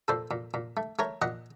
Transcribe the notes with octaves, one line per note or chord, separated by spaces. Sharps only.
A#2 A4 C5
A#2
A#2
A3
A3 A#4 C#5
A#2 D#5 F#5